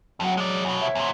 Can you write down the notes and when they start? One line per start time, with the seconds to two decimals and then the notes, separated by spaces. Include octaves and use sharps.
0.20 F2 F#3 F#4
0.37 G#3 D5
0.65 E2 B2
0.80 C3 C#5 E5
0.95 E2 A#2